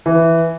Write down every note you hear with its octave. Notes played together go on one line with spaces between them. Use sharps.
E3